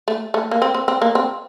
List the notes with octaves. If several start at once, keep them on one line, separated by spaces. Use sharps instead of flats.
A3
A3
A#3
C4
C4
C4
A#3
C4